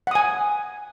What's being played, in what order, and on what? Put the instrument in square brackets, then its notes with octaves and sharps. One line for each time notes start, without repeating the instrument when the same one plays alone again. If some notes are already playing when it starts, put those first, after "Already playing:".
[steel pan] F#5
D#6
G#5